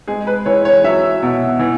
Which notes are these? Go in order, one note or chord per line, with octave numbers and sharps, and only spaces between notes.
G#3 G#4
B4
E3 C#5
C#5
F#3 E5
B2
E3